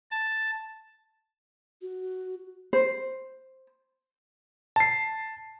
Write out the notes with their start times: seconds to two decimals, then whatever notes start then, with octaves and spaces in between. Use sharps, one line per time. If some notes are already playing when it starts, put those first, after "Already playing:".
0.11 A5
1.82 F#4
2.73 C5
4.76 A5 C7